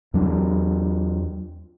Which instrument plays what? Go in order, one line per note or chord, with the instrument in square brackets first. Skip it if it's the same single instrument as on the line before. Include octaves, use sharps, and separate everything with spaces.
[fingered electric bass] E2 F#3 D4